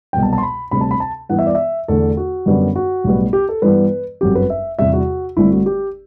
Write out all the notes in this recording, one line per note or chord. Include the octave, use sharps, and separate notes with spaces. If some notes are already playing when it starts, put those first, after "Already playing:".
C2 B2 F#3 G5
A5
A5
C6
B5
D2 C3 G3 C4 B5
A5
B5
A5
G2 E3 B3 F#5
E5
D5
E5
E2 D3 A3 D4 A4
F#4
F#2 D3 G3 B3 D4
F#4
B1 A2 G3 B3
G4
A4
G2 E3 G3 B3 B4
G1 F#2 F#3 C4 G4
B4
E5
E2 C3 G3 E5
F#4
G1 G2 D3 A3 C4 E4
F#4
G4